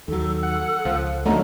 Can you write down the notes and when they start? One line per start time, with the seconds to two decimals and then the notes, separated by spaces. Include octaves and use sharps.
0.08 D#2 F#3 A4
0.43 F#5
0.85 C#2 F3
1.26 F2 D3 F#3 A3 A#3 D#4